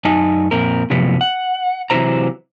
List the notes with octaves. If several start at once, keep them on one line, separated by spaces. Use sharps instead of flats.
F#2 D#4 G#5 A5
F2 A#2 C4 A#4
F#2 A2 C3 F3 B3 C#4
F#5
C3 E3 F#3 F4 C5 A#5